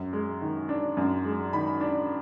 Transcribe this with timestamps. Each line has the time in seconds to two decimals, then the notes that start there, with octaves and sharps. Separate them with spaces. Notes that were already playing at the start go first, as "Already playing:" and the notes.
Already playing: F#2
0.13 G#3
0.42 D#3
0.69 D4
0.97 F#2
1.25 G#3
1.53 D#3 B5
1.80 D4